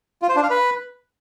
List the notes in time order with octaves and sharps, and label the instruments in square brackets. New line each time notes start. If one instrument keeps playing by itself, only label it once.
[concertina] F4
C5
D4
F5
B4